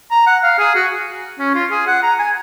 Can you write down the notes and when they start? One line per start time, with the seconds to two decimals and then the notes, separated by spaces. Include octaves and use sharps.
0.11 A#5
0.27 F#5
0.43 F5
0.59 G#4
0.75 F#4
1.39 C#4
1.55 F4
1.71 G#4
1.87 F#5
2.03 A#5
2.19 G#5